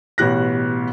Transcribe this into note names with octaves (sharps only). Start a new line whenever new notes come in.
A1 B2 G4 F#6 A#6